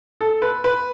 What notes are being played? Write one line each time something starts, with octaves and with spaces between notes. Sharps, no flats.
A4
B4
B4